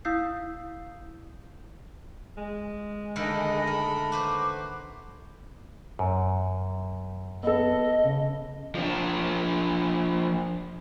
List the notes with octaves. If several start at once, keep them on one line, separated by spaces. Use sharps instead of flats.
E4 F5 D#6 E6 G6 C7
G#3
D3 D#3 A3 A#3 D#5 B5
A#4
F#4 B4 C5 D6
F#2
B3 A4 D#5
C#3
F3 D4